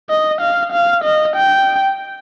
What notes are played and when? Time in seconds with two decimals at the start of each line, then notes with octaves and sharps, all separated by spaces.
0.10 D#5
0.41 F5
0.72 F5
1.04 D#5
1.36 G5